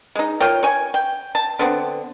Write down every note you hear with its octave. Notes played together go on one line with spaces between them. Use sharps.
G#3 D#4
F4 A#4 C#5 G5
C#5 G#5
G5
A5
D3 B3 C4